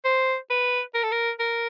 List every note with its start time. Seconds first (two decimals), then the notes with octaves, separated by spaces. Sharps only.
0.05 C5
0.50 B4
0.95 A#4
1.03 A4
1.12 A#4
1.40 A#4